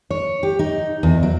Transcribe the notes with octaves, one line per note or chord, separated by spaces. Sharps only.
C#5
G4
D#4
E2
F#3